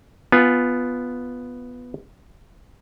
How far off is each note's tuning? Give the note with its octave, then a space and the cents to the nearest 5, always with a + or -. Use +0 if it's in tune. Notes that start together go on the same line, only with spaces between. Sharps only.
B3 +0 F4 +0 G#5 +0